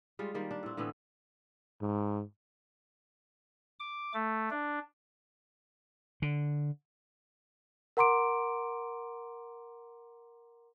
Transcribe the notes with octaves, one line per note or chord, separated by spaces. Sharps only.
G3 G#3 F4
D#3 G3 A#3
D4
A2 C4
A2 D3 E3 B3
G#2
D6
A3
D4
D3
A#4 F#5 A#5 C6 D6 D7